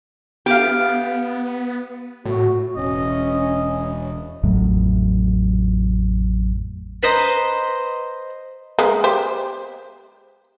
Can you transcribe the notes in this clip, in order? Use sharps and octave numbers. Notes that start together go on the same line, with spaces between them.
B3 G4 F5
A2 F#4
E1 C#4 D#5
A1 F2 A2 F#3
B4 C5 D#5 A#5
G#3 A#3 B3
G4 C5